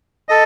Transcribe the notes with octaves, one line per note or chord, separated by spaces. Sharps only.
A4 D#5